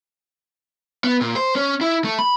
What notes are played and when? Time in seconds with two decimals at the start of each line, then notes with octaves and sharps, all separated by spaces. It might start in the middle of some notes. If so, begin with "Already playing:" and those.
1.04 B3
1.21 A#2
1.36 C5
1.56 C#4
1.81 E4
2.04 A3
2.19 B5